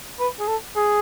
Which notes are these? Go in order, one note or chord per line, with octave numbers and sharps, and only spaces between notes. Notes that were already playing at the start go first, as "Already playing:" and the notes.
B4
G#4
A4
G#4